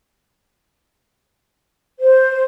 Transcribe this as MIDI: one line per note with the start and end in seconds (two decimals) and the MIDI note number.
2.00 2.41 72